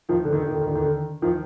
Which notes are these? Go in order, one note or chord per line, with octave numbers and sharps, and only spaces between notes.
D#3 F3
D3
D#3
D3
D#3
D3
D#3
D3
D#3
D3
D#3 F3